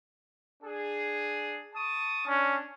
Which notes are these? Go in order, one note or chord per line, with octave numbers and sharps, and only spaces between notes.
D4 G#4
A5 C#6 D#6
C#4 D4